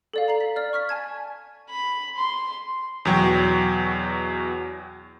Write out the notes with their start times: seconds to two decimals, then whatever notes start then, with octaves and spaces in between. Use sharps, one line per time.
0.14 A4 D5 F5
0.28 A#5 C7 F#7
0.40 B6
0.56 D5 F6
0.73 C#6 F6 B6
0.89 G#5 A5 G#6
1.69 B5
2.16 C6
3.05 E2 B2 F#3 G5 C#6